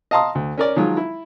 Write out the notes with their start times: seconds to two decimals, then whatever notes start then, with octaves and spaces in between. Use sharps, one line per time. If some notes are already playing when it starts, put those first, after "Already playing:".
0.11 D#5 F5 A5 A#5 C6 D#6
0.35 D2
0.58 C#4 A#4 D5
0.76 D#3 F3 F#3 G#3 F4
0.97 E4